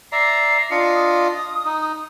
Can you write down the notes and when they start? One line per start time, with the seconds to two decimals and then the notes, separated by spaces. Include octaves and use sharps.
0.12 D5 E5 A#5 C7
0.71 D4 F4 D#5 C#7
0.95 D#6
1.65 D#4